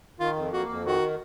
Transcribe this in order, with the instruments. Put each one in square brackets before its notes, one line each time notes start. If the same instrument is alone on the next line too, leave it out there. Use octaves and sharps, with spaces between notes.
[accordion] D#3 [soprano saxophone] F4
[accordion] F2
[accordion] A#3 [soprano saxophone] F#4
[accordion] F2
[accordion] D#3 [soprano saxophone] F#4